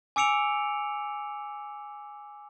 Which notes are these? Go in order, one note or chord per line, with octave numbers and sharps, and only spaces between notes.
G#5 D6 E6 C#7 D7 F7